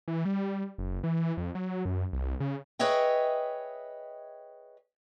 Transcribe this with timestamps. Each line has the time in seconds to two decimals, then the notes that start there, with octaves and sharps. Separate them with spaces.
0.08 E3
0.25 G3
0.78 F#1
1.04 E3
1.37 F2
1.55 F#3
1.85 F#2
2.13 C2
2.40 C#3
2.79 G#4 B4 C#5 D#5 E5 G5